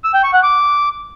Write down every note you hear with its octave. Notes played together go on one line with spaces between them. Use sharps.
E6
G5
C#6
F#5
D6